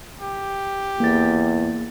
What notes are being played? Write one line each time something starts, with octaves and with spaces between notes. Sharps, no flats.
G4
E2 A#3 A6